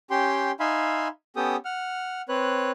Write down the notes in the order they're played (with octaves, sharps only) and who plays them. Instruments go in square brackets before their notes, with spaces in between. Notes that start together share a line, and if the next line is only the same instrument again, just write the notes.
[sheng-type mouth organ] C#4 G4 G5 C6
D#4 E5 F5 G#5 B5 C6
B3 C#4 G4 A4 G5 D#6
F#5 F6
C4 B4 C#5 F#6